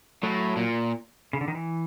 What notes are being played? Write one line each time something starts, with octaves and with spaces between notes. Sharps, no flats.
A2 F#3
A#2
C#3
D3
D#3
E3